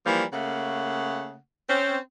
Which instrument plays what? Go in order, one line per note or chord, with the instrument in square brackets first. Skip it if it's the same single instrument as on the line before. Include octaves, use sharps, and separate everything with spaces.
[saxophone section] E3 F3 G3 A#3
C#3 A3 A#3 F#5
C4 C#4